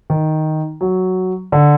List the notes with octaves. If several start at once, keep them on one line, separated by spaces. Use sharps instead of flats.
D#3
F#3
D3